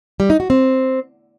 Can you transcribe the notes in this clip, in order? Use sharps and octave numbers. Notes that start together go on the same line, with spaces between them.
G3
D#4
F#4
C4